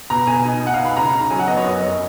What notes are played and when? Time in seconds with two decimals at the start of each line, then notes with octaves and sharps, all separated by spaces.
0.10 B2 A#5
0.27 B2 G#5
0.45 D#4
0.61 D#4
0.67 F#5
0.74 F5
0.79 B2
0.85 B5
0.96 C#3 A#5
1.13 D#4
1.22 A#5
1.30 F#3 G#5
1.39 F#5
1.48 B3 D#5
1.57 C#5
1.64 F#2 D#5
1.82 F#2